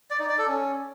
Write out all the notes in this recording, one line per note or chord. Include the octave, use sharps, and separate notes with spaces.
D5
D#4
D5
A4
C#4